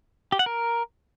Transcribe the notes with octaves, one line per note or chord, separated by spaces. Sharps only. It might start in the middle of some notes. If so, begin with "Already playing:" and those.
G4
F#5
A#4